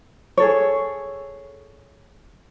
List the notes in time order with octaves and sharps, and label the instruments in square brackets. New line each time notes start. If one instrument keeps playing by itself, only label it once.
[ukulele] G#4 A4 C#5